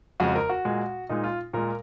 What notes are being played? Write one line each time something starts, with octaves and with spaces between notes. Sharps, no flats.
F2 C#3 G#3 F#4
A#4
F#4
A#2 G#3
A#2 G#3 D#4
F4
A#2 G#3 A#4